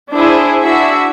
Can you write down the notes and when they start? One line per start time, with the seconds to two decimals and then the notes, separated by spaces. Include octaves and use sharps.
0.14 D4 E4 G#4 C5
0.63 D4 E4 F#4 E5